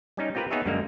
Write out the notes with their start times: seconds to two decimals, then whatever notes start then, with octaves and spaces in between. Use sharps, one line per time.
0.17 G3 C#4 D#4
0.35 C4 F4 G4 A#4 B4
0.51 B3 D#4 G#4 C#5 E5
0.66 F#2 D3 G3 G#3 A#3